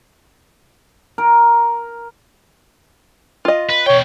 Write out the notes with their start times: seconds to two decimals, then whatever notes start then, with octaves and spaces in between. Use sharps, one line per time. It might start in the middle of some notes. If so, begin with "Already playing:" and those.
1.18 A#4
3.45 F4 D#5
3.70 B4
3.86 B2 C#5 G5